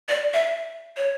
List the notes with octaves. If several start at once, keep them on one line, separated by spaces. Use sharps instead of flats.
D5
E5
C#5